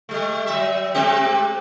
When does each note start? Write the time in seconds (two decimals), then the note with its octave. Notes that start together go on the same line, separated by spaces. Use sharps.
0.09 G3 A3
0.47 F#3 E5
0.94 G#3 C4 G4